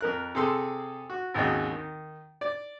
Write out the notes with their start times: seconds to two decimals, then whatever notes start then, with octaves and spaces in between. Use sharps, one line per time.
0.01 F2 A#4 F#6
0.35 C3 G#4 A4 C6 E6
1.10 F#4
1.34 G#1 D#2 C#3 D#4 F#4
1.71 D#3
2.41 D5